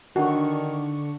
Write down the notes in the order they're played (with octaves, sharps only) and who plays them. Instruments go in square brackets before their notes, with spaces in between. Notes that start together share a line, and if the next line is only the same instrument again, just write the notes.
[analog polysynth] D3 D4 C#6 [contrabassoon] D#3 [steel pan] F#4